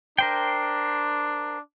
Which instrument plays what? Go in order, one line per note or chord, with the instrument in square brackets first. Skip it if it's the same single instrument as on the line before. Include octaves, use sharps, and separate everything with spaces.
[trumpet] D4 [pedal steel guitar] A#4 C5 G5